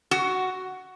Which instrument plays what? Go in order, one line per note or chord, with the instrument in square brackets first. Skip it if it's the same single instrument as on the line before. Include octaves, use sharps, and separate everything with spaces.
[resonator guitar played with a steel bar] F#4